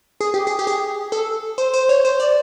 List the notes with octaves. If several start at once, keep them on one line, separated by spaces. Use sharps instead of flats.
G#4
G4
G#4
G4
G#4
A4
C5
C5
C#5
C5
D5